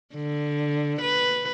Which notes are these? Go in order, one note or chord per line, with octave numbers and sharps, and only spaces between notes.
D3
B4